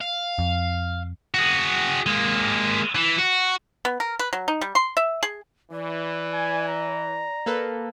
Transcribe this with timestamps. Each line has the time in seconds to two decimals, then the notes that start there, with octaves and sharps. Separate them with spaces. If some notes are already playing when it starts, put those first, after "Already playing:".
0.01 F5
0.39 F2
1.34 F#4 G#4
2.06 G#3 A#3
2.95 E3
3.18 F#4
3.85 B3
4.00 A#4
4.19 B4
4.33 F#3
4.48 D#4
4.61 G3
4.75 C6
4.97 E5
5.23 G#4
5.72 E3 D5
6.33 G#5
6.69 A#5
7.46 A#3 A4 B4